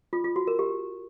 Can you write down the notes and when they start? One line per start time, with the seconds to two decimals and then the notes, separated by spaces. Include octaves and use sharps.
0.13 F4
0.24 F4
0.36 F#4
0.47 A#4
0.59 G4